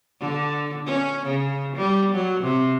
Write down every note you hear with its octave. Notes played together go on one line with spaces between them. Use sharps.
D3
C#4
C#3
G3
F#3
C3